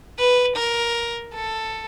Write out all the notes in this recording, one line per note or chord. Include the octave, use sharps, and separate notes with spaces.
B4
A#4
A4